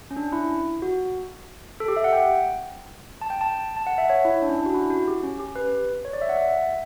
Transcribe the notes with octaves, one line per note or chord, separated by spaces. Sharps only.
C#4
D4
E4
F#4
A4
G4
E5
F#5
G5
A5
G5
A5
A5
F#5
E5
C#5
E4
D4
C#4
D4
F#4
E4
F#4
G4
C#4
G4
B4
C#5
D5
E5
F#5
E5